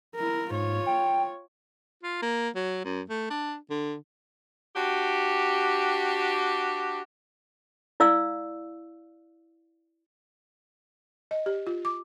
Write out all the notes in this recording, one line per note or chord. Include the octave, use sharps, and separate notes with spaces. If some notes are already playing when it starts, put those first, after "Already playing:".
E4 A#4
G#2 F4 C#5
G5
F4
A#3
F#3
F#2
A3
D4
D3
D4 F#4 G4
E4 D5 F5 E6
D#5
G4
F4
D6